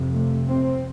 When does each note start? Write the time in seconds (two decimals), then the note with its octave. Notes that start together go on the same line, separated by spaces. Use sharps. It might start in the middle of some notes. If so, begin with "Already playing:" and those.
Already playing: F2 C3
0.13 A3
0.48 C4